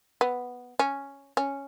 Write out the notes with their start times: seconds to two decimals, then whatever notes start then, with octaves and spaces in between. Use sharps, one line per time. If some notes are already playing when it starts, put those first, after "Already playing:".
0.21 B3
0.79 C#4
1.37 C#4